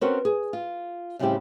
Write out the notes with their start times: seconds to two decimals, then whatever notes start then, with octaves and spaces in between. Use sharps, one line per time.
0.01 C4 C#4 F#4 A#4 B4 C#5
0.25 G#4
0.53 F4
1.19 A2 C#3 G3 C4 E4 G4